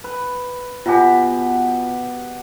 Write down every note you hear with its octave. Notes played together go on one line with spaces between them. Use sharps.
B4
B2 F4 G4 F#5 G#5